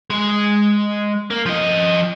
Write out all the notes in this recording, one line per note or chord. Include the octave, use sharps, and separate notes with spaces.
G#3
A#3
F3 D#5